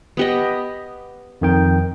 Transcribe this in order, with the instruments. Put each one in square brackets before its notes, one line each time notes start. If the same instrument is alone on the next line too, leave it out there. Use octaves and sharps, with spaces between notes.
[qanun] B3 G4 D#5
[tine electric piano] F2 D#3 G5